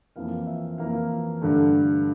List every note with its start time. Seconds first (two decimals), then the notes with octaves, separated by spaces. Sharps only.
0.16 F2 E3 A#3 F5
0.47 E5
0.78 F2 E3 A#3 F5
1.41 G2 D3 A3